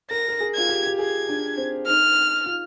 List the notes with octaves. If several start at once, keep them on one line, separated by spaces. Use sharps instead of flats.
A#4 A#6
A#4
G#4
F4 G#6
G4
G4
G#4 G#6
D4
C4
D#4 F6
F4